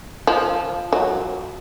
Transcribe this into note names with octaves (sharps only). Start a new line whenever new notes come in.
F3
F#3